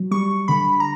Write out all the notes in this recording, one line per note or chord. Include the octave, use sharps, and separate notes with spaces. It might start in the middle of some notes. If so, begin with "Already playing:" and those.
Already playing: F#3
G3 C#6
D3 B5
A#5